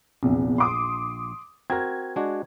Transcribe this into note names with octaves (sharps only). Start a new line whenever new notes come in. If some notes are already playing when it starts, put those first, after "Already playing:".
A#1 E2 C3
C6 D6 D#6
C4 F#4 A#4 G#6
G#3 D4 F#4